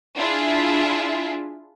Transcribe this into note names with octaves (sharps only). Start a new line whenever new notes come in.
D4 E4 F4 G#4 E5